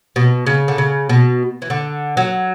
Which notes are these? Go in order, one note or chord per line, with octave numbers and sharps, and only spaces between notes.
B2
C#3
D3
C#3
B2
E3
D3
F#3